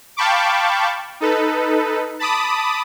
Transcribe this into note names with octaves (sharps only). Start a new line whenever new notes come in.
F5 G5 A5 B5 C#6 D6
D#4 A4 B4
A5 B5 D6 D#6